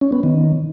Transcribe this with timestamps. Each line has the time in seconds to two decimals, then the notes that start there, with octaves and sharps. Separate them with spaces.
0.01 C#4
0.12 B3
0.23 D#3